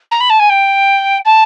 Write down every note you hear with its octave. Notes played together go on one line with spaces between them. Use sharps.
A#5
B5
A5
G#5
G5
A5